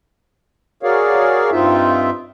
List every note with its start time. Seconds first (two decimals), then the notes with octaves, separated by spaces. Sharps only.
0.83 F#4 G#4 A#4 C#5 D5 F5
1.51 G2 C4 D#4 F4 E5